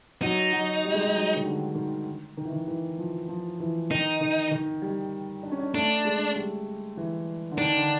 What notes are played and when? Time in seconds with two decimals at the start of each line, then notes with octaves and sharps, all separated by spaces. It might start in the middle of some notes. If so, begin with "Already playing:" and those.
0.22 F#3 D#4
0.53 F#3
0.84 G3
0.94 G#3
1.03 G3
1.14 F#3
1.36 D#3
1.45 D3
1.75 D#3
2.37 D#3
2.45 E3
2.52 D#3
2.68 E3
2.98 F3
3.29 F3
3.60 E3
3.91 D#3 D#4
4.21 D#3
4.51 D#3
4.82 G3
5.43 D4
5.52 C#4
5.59 D4
5.74 A3 D4
6.05 G#3
6.36 G3
6.97 E3
7.51 D3
7.58 D#3 D4
7.77 D3